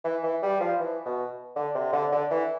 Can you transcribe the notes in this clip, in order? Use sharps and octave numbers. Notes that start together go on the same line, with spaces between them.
E3
E3
G3
F3
E3
B2
D3
C3
D3
D3
E3